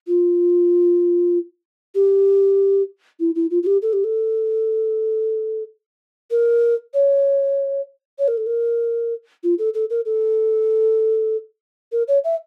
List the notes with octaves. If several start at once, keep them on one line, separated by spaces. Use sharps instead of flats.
F4
G4
E4
E4
F4
F4
G4
A4
G4
A4
A#4
C#5
C#5
A#4
A4
A#4
F4
A4
A4
A#4
A4
A#4
C#5
E5